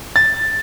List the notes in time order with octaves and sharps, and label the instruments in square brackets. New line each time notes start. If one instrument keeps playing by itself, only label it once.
[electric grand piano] A6